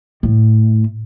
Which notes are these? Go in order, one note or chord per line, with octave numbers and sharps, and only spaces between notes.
A2